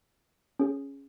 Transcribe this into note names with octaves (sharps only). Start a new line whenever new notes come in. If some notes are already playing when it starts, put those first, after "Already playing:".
C#4 G#4